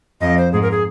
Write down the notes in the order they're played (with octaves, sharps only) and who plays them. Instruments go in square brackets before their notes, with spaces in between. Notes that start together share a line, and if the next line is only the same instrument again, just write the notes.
[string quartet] F2 [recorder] D#5
[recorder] C5
[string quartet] G#2 [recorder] G#4
[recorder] A#4
G#4